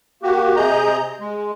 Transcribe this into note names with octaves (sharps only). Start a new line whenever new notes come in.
A#3 F#4 G4
C3 G#4 D#5 A#5 G6
G#3